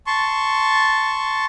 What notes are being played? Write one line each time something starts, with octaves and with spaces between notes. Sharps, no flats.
A5 C6 C#6